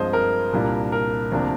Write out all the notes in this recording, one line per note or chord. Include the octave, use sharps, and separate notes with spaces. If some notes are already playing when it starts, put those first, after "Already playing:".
Already playing: G2 F3 G#3 C4 C5 D#5
A#4
C2 A#2 G3 A#3 D4
A#4
D2 C3 F3 A#3 D4